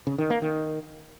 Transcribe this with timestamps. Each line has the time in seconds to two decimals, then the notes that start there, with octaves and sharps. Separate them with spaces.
0.07 C#3
0.18 D#3
0.30 A#3
0.42 D#3